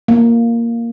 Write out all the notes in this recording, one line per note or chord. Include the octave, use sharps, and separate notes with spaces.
A#3